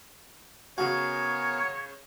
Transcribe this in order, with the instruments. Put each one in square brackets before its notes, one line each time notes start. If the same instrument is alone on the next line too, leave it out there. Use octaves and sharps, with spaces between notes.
[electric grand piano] C#3 F5 [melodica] B3 A#4 G#5 [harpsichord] F#4 [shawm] C#5